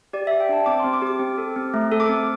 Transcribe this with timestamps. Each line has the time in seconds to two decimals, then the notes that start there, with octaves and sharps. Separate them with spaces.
0.13 G4 D5
0.27 G4 E5
0.40 G5
0.49 D4 A5
0.66 C4 D6
0.79 C6
0.84 C4
0.93 D6
1.02 G4
1.07 D6
1.20 C4
1.38 A4
1.56 C4
1.74 A3
1.92 A4
2.00 D6
2.09 C4